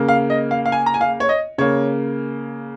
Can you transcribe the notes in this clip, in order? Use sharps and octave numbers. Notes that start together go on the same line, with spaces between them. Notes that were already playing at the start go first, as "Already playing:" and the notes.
Already playing: C#3 A#3
F5
D#5
F5
F5
G#5
A#5
G#5
F5
C#5
D#5
C#3 A#3 C#5